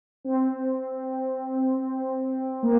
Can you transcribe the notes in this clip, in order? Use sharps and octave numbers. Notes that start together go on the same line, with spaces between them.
C4
A#3